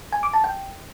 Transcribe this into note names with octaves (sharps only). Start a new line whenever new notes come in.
G#5
D6
A5
G5